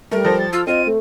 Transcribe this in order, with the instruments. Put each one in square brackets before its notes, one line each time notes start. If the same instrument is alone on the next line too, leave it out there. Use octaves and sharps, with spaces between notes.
[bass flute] G3 [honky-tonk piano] A3 [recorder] A#4
[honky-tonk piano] F3 A4 C5 [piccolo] A#6
[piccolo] A6
[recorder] F4 [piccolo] E6
[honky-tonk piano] C4 [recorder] F4 [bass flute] D#5 [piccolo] D#7
[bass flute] A3